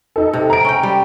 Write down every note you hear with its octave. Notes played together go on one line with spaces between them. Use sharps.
D#4 A4
C3
A#5 D7
C#4 G5
G3